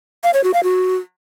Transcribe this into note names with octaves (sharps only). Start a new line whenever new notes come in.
F5
C#5
F#4
F5
F#4